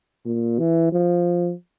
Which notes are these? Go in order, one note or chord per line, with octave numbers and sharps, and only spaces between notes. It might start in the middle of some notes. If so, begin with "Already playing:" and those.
A#2
E3
F3